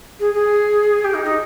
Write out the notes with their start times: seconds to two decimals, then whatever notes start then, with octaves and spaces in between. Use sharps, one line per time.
0.19 G#4
0.33 G#4
1.04 G4
1.14 D#4
1.24 D#4